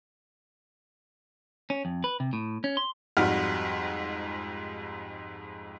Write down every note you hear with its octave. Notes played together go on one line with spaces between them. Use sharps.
C#4
F2
B4
C3
A2
C#4
C6
F2 G#2 G3 F#4 F6